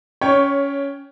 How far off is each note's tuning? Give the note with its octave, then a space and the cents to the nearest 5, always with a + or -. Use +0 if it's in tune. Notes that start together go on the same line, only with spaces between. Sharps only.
C#4 +15 C#5 +0 G5 +0